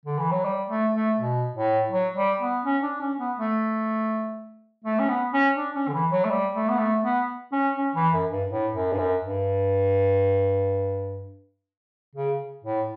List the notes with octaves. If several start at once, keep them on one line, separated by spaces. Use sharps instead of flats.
D3
E3
F#3
G3
A3
A3
B2
A2
F#3
G3
B3
C#4
D4
C#4
B3
A3
A3
C#4
B3
C#4
D4
C#4
D3
E3
F#3
A3
G3
A3
B3
A3
B3
C#4
C#4
E3
F#2
G2
A2
F#2
G2
F#2
G2
C#3
A2